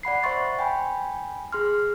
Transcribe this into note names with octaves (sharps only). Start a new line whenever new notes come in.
D5 F#5 B5 C7
C5 E5 C6 C#6 A6
G5 G#5 B5
G#4 C6 F6